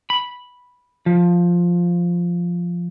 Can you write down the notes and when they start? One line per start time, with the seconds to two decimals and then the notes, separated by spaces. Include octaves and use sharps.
0.10 B5
1.06 F3